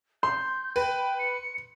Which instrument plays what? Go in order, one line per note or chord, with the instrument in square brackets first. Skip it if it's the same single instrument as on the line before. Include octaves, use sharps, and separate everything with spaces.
[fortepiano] C6 [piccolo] G6
[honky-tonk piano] B4 [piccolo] G5
[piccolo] C#7